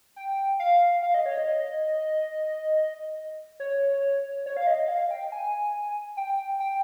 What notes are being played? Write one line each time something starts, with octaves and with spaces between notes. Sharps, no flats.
G5
F5
F5
D#5
C#5
D#5
C#5
C#5
F5
D#5
F5
G5
G#5
G5
G5